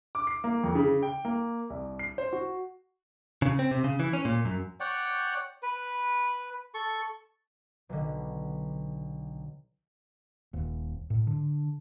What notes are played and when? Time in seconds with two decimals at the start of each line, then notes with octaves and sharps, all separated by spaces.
0.15 D6
0.27 C7
0.44 A#3
0.63 F2
0.75 C#3
1.03 G5
1.25 A#3
1.70 C2
1.99 C7
2.18 C5
2.33 F#4
3.42 C#3
3.59 C4
3.71 C3
3.84 C#3
4.00 E3
4.13 C#4
4.25 A#2
4.45 F#2
4.80 C#5 D5 F#5 G5
5.63 B4
6.74 A4 C#6
7.89 B1 D3
10.53 D#1
11.10 A2
11.27 D3